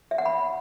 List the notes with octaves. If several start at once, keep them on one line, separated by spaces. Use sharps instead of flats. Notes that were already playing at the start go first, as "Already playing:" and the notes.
E5
F#5
B5